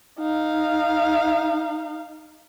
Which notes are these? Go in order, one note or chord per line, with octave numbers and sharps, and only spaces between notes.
D#4 F5